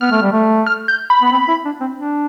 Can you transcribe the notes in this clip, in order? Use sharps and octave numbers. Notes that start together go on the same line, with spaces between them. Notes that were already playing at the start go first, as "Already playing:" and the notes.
B3 F6
A3
G3
A3
F6
G6
B5
B3
C4
E4
D4
C4
D4